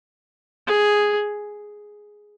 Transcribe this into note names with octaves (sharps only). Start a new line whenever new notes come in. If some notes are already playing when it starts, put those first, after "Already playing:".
G#4